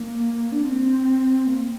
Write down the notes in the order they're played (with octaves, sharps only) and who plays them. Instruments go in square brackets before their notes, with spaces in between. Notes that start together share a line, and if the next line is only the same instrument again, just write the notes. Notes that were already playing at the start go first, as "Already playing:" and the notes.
Already playing: [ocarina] A#3
D4
C4
A#3